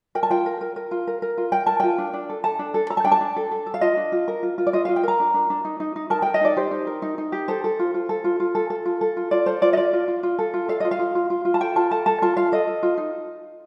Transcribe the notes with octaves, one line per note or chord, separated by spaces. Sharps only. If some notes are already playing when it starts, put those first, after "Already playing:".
A#4 G5
A5
F4 G5
A#4
A#4
A#4
F4
A#4
A#4
F4
A#4 G5
A#4 A5
F4 G5
D4
D4
A4
A4 A5
D4
A4
A4 A#5
A5
D4 G5
A5
D4
A4
A4
A4
F5
F4 D#5
D4
F4
A#4
F4
F4
D5
F4 D#5
F4 F5
G5
A#4 A#5
D4
D4
D4
D#4
D#4
D#4
A#4 A5
A#4 G5
D#5
D#4 D5
G4 C5
D#4
A#4
D#4
D#4
G4
A4 C5
A4
F4
F4
A4
F4
F4
A4
A4
F4
A4
F4
F4 D5
A4 C5
F4 D5
D#5
F4 D5
F4
F4
F4
A4
F4
A4 F5
F4 D#5
F5
F4
F4
F4
F4
A5
A4 G5
F4 A5
A4 A5
A4 A5
F4 A5
F4 F5
A4 D#5
A4
F4
D#4